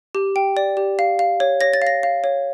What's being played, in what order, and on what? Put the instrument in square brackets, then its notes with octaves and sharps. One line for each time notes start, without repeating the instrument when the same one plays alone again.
[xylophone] G4
G5
D5
G4
F5
F5
C#5
C#5 A#6
A6
F5
A#6
F5
C#5